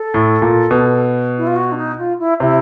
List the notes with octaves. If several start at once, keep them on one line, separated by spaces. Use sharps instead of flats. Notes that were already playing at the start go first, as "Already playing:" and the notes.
Already playing: A4
A2
A#2
B2
E4
F4
F#4
D4
D#4
F4
E4
C3 E4